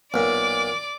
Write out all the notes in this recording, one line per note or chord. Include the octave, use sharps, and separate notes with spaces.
B1 A#2 D5 D6